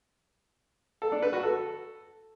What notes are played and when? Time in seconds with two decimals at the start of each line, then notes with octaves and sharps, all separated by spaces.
1.02 A4
1.12 D4
1.22 B4
1.33 F#4
1.43 A4